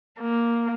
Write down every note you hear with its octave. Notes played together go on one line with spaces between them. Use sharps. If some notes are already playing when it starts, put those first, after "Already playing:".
A#3